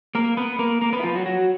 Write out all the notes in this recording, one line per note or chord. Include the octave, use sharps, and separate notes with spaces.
A#3 A#4
B3 B4
A#3 A#4
A#3 A#4
B3 B4
E4
F3 F4
F#3 F#4
F#3 F#4